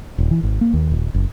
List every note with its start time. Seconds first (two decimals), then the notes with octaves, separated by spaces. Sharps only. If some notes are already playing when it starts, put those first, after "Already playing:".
0.18 D#1
0.31 E3
0.43 G#1
0.61 A#3
0.74 D#2
0.92 D#1
1.14 F#1